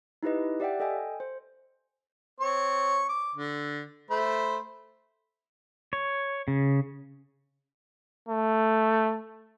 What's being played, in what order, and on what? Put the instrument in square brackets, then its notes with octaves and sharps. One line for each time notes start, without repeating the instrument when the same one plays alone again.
[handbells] D#4 E4 G4 B4 D#5
G4 D5 E5 F#5 G5
A4 D#5 G5 G#5
C5
[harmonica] C4 C#5 C#6
D6
D3
A3 C5 B5
[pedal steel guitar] C#5
C#3
[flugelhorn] A3